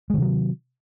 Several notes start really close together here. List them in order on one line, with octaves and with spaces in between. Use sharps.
G#3 D#3 C3 F#3